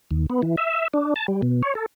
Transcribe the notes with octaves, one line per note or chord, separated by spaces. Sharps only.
D#2
B3
E3
E5
D4
A5
G3
B2
C#5
A4